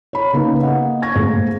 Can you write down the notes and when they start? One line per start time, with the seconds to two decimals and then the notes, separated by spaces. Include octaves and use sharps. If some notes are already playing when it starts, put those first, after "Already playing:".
0.13 C#5 B5
0.33 C#3 A#3 D#4 B4
0.63 A#3 D#5 F#5
1.02 C#6 G#6 A#6
1.15 G#2 A3 A#3 C4